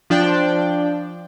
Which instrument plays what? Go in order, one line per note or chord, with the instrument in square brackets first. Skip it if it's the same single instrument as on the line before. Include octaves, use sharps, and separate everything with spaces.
[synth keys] F3 D4 D5 G5